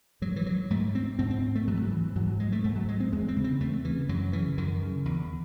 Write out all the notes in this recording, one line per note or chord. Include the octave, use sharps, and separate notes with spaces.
G#2 F#3
E3
F#3
G#2 A3
C4
G#2 C4
C4
A3
G#2 F#3
E3
F#3
E3
G#2 F#3
F#3
G#3
A3
G#2 A3
F#3
G#3
C4
E2 G#3
C4
C#3
C4
E2 A3
C#3 E3
F#2 F#3
C#3 E3
F#2 D#3
C#3
E2